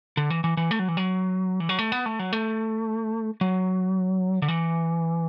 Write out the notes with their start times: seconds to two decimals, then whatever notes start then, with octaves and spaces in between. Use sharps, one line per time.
0.17 D3
0.30 E3
0.44 E3
0.57 E3
0.71 A3
0.79 F#3
0.88 E3
0.97 F#3
1.60 E3
1.69 F#3
1.79 A3
1.92 B3
2.06 A3
2.19 F#3
2.33 A3
3.41 F#3
4.42 D3
4.48 E3